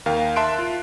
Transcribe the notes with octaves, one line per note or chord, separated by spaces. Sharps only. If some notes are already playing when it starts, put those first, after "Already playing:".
D#2 A#4 F5 G5
E5 A5 C6 F#6 D7
F4